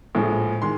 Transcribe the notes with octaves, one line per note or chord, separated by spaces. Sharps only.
A#1 A2 F3 G#3
D#3 G#3 C6